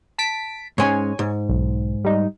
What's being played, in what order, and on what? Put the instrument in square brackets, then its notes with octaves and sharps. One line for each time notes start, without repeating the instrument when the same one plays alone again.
[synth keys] A5 B6 D7
[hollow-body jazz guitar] G#2 G#3 C#4 [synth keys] C#5 G#5
[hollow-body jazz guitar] G#2
[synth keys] B1
G3 D#4